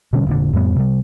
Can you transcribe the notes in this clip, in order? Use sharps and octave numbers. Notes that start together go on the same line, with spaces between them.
B2 D3 G3 C#4
F1 A#2 D3
F2 A2 G3 B3
C3 G3